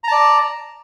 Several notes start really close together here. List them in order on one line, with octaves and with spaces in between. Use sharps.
A#5 A5 D5